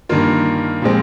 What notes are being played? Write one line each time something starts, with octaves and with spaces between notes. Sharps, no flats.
G2 D#3 A#3 F4
A#2 F3 G#3 C4